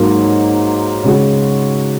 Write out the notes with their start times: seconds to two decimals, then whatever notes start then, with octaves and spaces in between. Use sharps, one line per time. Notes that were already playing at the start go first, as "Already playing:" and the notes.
Already playing: G#2 F#3 A#3 D#4
1.04 C#3 G#3 F#4